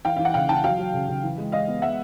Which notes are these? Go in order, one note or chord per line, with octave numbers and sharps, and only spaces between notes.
E3 F5 G5
E3 F5
F#5
C#3 F5 G5
E3 G5 A5
F#3 F5 G5
F#3
C#3
C#3
E3
G#3
G#3 D#5 F5
B3
G#3 E5 F#5